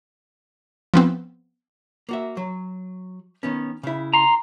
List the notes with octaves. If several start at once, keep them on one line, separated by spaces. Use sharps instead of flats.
F3 B3 C4
A#3 F#4 E5
F#3
D#3 B3 C#4
C#3 E4
A#5 C6